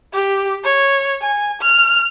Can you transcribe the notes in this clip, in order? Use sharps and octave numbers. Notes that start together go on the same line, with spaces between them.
G4
C#5
G#5
F6